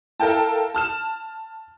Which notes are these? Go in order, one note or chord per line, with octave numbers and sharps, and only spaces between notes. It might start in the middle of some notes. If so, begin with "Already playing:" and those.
E4 A4 A#4 F5 G5 A5
A5 F6 E7